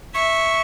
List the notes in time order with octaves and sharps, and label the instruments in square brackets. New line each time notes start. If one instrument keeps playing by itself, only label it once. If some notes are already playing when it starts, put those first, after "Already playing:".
[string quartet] E5 [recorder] C#6